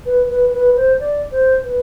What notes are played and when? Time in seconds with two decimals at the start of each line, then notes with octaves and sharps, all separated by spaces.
0.06 B4
0.29 B4
0.53 B4
0.76 C5
1.00 D5
1.31 C5
1.63 B4